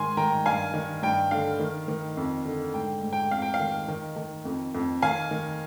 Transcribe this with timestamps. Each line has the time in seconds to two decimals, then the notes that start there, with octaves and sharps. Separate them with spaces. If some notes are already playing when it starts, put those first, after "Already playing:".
Already playing: G#2 D#3 G#5 C6
0.17 D#3 G5 A#5
0.46 G2 F5 G#5
0.74 D#3
1.02 G2 G5
1.31 D3 F5
1.59 D#3
1.88 D#3
2.17 F2
2.45 D3
2.74 G#2 G5
3.02 G#2
3.13 G5
3.31 F2 F5
3.42 G5
3.54 F5
3.60 D#3
3.88 D#3
4.16 D#3
4.45 F2
4.74 F2
5.02 D#3 F5 G#5
5.31 D#3